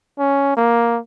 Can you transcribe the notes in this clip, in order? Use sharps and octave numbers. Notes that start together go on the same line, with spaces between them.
C#4
A#3